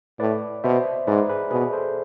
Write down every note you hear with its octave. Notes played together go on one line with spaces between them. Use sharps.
A2 B4 D5
B2 C5 E5
G#2 B4 D5
G#4 B4
B2 G#4 B4
A4 C5